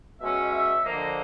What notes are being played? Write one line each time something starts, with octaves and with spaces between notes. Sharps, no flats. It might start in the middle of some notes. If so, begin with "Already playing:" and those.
B2 G#3 C#4 E5
E5
D3 F3 A#3 D#5